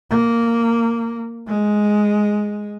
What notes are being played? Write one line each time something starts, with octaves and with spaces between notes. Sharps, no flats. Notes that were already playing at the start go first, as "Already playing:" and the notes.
A#3
G#3